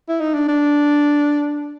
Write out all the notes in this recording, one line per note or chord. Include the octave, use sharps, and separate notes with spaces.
E4
D#4
D4
D4